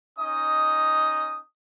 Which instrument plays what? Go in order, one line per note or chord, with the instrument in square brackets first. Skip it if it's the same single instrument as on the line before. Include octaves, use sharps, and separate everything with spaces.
[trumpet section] C#4 D#4 D#5 D#6